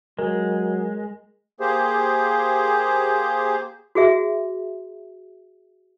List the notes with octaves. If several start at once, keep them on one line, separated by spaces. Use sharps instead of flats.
F#3 G#3 A#4
A#3 G4 G#4 C5
F#4 G#4 E5